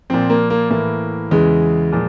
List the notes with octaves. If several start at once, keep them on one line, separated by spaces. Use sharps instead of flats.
A#2 F3 C4
A#3
A#3
A2 E3 A#3
E2 C#3 E3 G#3
A#2 F3